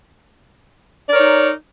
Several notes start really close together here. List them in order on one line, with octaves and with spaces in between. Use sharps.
D5 A#4 C#5 D#4